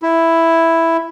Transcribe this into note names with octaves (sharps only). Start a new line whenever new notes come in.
E4